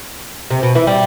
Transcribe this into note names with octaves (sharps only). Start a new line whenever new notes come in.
C3
B2
E3
G3